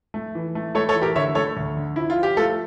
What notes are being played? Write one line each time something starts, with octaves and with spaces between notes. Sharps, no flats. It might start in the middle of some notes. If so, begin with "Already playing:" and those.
A3
E3
A3
A3 A4 C#5
A4 C#5
E3
G4 A#4
D3 C#5 E5
A3 A4 C#5
D2
D3
F3 E4
F4
F3
G4
A3 F4 A4